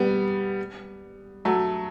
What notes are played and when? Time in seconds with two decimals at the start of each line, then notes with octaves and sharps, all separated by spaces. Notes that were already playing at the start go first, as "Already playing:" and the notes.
Already playing: G3 B3
1.45 F#3 A3